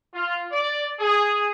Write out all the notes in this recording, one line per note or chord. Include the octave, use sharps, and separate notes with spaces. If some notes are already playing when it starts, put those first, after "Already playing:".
F4
D5
G#4